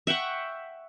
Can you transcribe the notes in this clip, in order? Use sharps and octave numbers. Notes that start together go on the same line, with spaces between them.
E5 F#5 G5 C#6